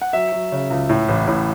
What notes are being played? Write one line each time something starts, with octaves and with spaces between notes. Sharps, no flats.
F#5
F#3 E5
F#3
C#3
C#2
A2
A1
A2